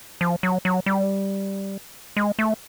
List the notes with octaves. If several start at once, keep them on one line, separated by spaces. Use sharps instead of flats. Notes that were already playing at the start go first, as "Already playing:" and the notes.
F3
F#3
F#3
G3
G#3
A3